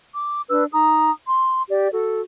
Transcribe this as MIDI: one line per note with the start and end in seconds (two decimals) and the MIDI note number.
0.13 0.42 86
0.49 0.64 62
0.49 0.64 71
0.49 0.64 88
0.73 1.11 63
0.73 1.11 82
0.73 1.11 87
1.28 1.62 84
1.68 1.88 67
1.68 1.88 74
1.92 2.22 66
1.92 2.22 69